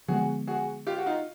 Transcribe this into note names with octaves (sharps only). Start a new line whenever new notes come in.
D3 F3 G#3 B3 F#4 G#4
F#4 G#4
F4 G4
F#4
D#4 F4